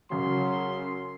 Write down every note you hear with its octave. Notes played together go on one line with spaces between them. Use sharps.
F#2 C#3 F#3 C6